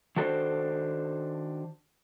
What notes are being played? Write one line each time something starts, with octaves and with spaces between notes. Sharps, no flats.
D#3 D4 F#4 A4 B4 C5